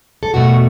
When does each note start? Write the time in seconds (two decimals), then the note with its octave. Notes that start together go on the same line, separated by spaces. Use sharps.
0.23 A4
0.34 E2 B2 A3 F#4